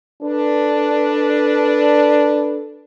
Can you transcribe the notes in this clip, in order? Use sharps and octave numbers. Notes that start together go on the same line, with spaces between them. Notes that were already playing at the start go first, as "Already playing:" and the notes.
D4 A4 B4